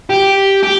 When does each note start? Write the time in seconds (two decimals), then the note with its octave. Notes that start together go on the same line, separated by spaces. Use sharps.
0.10 G4
0.63 G4